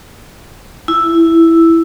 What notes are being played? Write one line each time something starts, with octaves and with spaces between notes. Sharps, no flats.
E4